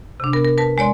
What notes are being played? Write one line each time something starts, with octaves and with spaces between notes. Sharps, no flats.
C3 D4
B3 A#4
A#4
A#4 B4 A5
G#3 C#5 D5 C6